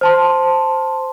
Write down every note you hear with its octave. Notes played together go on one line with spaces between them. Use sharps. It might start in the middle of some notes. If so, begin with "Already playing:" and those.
C5 A5 C6